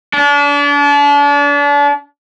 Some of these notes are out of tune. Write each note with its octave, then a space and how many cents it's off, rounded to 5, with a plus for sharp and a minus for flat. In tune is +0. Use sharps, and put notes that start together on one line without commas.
D4 -35